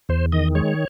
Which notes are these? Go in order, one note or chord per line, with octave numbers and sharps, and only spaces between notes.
E2 C5
D#3 D#5
G#3 C#5